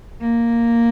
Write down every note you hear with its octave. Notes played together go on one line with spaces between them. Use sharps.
A#3